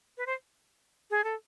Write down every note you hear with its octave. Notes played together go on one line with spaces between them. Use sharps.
B4
C5
G#4
A4